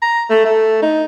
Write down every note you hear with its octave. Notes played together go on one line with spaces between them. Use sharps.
A#5
A3
A3
D#4